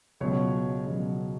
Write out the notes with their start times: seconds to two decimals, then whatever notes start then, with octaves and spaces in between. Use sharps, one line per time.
0.20 C#2 B2 F#3 C#5
0.86 C#2 B2 F#3